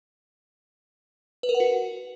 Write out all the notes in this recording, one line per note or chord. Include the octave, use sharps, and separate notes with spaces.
B4
A#4
F#5
F#4